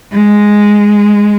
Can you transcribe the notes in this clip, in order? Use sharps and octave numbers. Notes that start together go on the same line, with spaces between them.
G#3